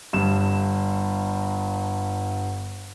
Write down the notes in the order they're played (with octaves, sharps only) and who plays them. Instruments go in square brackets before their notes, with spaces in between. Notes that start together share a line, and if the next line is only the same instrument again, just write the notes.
[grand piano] G1 G2 E7